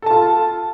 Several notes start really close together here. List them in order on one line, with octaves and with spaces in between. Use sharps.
A4 A5 F4